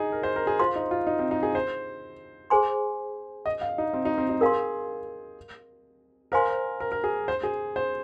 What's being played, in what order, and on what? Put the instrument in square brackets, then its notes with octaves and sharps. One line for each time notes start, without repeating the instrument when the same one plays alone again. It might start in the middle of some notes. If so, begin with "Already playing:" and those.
Already playing: [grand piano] D#4 G#4
A#4
C5
A#4
G#4
[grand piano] F4 [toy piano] C5 F5 C6
[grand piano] D#4
F4
D#4
C4
D#4
G#4
C5
[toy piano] G#4 C5 G#5 C6
[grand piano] D#5
F5
D#4
C4
D#4
C4
D#4
[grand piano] G#4 [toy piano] A#4 F5 C6
[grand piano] A#4 [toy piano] C5 F5 G#5 C6
[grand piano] A#4
A#4
G#4
C5
G#4
C5